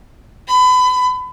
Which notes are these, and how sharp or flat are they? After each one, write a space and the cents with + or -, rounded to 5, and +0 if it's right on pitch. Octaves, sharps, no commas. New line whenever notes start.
B5 +30